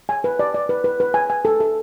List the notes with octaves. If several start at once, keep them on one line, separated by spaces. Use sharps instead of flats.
G#5
B4
D5
D5
B4
B4
B4
G#5
G#5
A4
A4